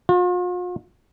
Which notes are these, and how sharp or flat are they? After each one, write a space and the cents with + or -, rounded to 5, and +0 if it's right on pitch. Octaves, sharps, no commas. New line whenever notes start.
F4 +45